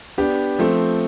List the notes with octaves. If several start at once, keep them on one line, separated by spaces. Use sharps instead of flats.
B3 D4 G4
F3 A3 C4